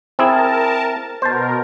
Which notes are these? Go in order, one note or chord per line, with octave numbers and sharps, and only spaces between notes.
C4 E4 G#4 A#4 A5
B2 A#4 C5 A5